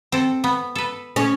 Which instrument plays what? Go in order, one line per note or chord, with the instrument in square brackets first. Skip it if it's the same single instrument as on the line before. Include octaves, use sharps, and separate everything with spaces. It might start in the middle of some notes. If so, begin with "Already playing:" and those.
[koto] C4 A4
B3
A4 B4
[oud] C#4